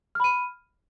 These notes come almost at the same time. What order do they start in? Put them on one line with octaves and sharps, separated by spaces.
F6 B5 D#7